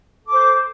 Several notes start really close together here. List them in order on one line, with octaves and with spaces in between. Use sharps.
A4 D6 C5